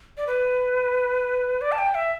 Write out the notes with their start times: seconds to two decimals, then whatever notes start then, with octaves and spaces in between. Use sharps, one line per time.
0.17 D5
0.27 B4
1.61 D5
1.72 A5
1.78 G5
1.95 E5